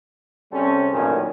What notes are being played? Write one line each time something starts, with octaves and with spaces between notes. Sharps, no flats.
C3 G3 C4 C#4 G#4 A4
A1 F#2 A#2 D#3 C#4